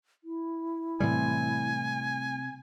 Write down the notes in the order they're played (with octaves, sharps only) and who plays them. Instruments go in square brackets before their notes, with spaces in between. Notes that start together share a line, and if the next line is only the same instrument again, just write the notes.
[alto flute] E4
[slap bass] A2 E3 G3 [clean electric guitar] C3 C4 [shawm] G#5